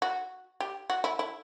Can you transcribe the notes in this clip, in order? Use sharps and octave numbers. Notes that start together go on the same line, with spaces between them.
F#4
G4
F#4
E4
E4